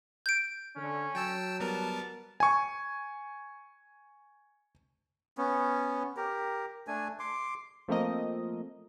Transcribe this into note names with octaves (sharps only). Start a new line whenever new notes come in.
G6 D7
D3 C#4
F#3 G5 A5 E6
G3 B3 A#4 A5
G#5 C#6
B3 C#4
G4 A#4
A3 D4 G#5
C6 D6
F3 A3 A#3 C4 A#4 D#5